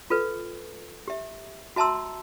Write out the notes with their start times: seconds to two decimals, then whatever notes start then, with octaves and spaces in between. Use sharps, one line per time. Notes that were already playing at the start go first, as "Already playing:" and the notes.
0.10 F4 A4 B4
1.08 G4 E5
1.76 F#4 E5 A5 A#5 C6 E6